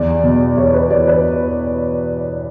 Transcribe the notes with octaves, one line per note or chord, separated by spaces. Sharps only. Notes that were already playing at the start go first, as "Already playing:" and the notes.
Already playing: E2 D5
B2
E2 C#5
B4
E2 D5
B4